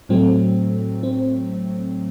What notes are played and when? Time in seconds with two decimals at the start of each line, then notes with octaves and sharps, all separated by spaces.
0.09 A2 F#3 A3 C4
1.03 C4